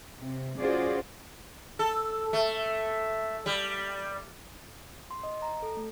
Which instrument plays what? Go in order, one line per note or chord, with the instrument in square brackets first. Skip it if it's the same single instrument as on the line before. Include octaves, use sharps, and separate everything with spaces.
[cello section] C3
C#4 F4 F#4 G#4 C5 D5
[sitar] A4
A3
G3
[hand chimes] C6
D#5
A#5
A4
A3